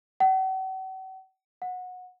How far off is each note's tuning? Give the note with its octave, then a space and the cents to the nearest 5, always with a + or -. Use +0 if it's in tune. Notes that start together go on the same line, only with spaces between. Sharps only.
F#5 +45
F#5 -20